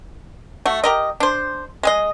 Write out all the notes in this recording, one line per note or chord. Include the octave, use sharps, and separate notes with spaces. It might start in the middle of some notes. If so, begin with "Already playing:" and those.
A3 F#4
G4 A#4 D#5
D4 C5
G#3 G#4 D#5